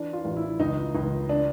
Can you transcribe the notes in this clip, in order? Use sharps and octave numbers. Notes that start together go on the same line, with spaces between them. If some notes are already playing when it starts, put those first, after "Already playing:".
Already playing: E3 D4
F4
A1
E4
C#2 D#4
C#2
D4